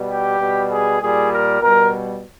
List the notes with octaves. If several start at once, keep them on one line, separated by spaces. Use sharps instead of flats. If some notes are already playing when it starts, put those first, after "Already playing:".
Already playing: B2 G3
G4
B2 G3
G#4
A#2 G3 G#4
A#4
B2 G3 A#4